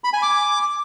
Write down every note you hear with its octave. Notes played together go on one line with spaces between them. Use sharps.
B5
G#5
D6